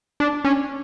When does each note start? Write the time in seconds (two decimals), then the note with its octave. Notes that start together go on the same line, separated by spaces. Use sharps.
0.20 D4
0.45 C#4